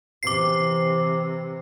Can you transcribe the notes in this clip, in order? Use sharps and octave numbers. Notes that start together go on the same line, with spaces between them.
C3 E3 D6 C7